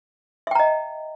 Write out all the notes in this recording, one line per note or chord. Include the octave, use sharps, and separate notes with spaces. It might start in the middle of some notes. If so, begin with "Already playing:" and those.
D#5 E5 G5 A#5